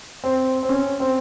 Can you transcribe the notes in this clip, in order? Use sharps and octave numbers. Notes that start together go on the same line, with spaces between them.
C4
C4
C#4
C4